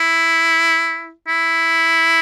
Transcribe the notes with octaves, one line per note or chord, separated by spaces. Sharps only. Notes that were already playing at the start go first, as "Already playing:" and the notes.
Already playing: E4
E4